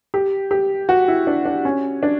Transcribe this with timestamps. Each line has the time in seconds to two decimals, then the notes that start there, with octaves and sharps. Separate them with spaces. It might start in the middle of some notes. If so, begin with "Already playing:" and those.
0.14 G4
0.51 G4
0.89 F#4
1.08 E4
1.27 D4
1.45 D4
1.65 C#4
2.03 D4